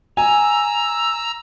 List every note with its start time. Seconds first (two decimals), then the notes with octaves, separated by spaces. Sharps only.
0.17 G#5 A#5 E6